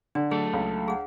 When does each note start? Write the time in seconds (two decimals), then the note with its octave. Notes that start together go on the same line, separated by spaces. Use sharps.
0.15 D3 D4
0.31 F#3 A3 G#4 A4
0.53 C#2
0.88 G#4 F#5